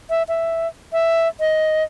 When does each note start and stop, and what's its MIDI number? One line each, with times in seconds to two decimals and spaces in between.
0.10 0.23 76
0.28 0.68 76
0.93 1.28 76
1.40 1.84 75